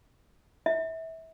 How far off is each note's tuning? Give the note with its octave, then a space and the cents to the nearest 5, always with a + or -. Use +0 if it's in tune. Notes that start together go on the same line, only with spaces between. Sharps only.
E5 -25